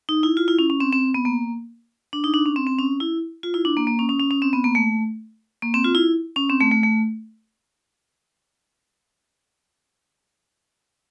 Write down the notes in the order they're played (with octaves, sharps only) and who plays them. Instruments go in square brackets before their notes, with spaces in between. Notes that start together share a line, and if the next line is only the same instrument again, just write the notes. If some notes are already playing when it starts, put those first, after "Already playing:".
[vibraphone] D#4
E4
F4
E4
C#4
C#4
C4
C4
B3
A#3
D4
D#4
D4
C#4
C4
C4
C#4
E4
F4
E4
D4
A#3
A#3
C#4
C#4
C#4
C#4
C4
B3
A#3
A3
A#3
C4
F4
E4
C#4
C4
A3
A3
A3